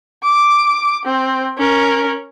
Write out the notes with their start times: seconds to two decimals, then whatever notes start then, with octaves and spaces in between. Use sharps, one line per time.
0.23 D6
1.05 C4
1.58 C#4 A#4